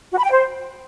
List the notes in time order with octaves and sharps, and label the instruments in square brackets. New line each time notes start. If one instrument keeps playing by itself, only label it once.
[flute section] F#4
B5
G5
C5